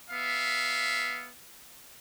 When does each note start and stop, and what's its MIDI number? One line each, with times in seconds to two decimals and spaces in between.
0.11 1.29 59
0.11 1.29 76
0.11 1.29 77